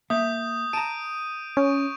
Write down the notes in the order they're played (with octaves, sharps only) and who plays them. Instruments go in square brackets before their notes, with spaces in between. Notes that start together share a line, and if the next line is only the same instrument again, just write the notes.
[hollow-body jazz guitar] A#3 E5 [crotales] D#6 G6
[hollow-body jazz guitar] A5 A#5 [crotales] D7 D#7
[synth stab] C#4 [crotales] C#6